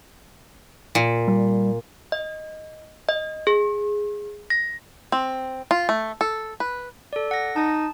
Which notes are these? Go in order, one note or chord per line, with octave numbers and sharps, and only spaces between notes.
A#2
G3
D#5
D#5
G#4
A#6
C4
F4
A3
A4
B4
A4 D5
F#5 A#6
D#4 A5